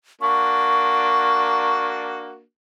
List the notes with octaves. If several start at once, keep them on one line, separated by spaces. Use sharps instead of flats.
A#3 D4 F#4 C#6